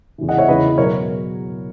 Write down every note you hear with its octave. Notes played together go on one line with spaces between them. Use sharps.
E2 C#3 E3
D#5 F#5
C#5 E5
E2 C#3 E3 B4 D#5
B2 F#3 A#4 C#5